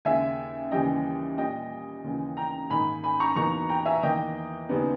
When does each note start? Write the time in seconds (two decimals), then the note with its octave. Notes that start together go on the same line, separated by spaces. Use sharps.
0.05 D#2 C#3 G#3 E5 G#5
0.71 D#2 C#3 E3 G3 C#4 D#5 G5
1.37 A#2 G3 C#4 D#5 G5
2.04 D#2 C#3 E3
2.37 G5 A#5
2.70 G#2 D#3 A#3 D#4 G#5 B5
3.04 G#5 B5
3.20 A#5 C#6
3.36 E2 B2 A#3 D#4 A#5 C#6
3.69 G5 A#5
3.86 E5 G#5
4.03 E2 D#3 A#3 D#5 G5
4.69 D#2 C#3 G3 B3 D#4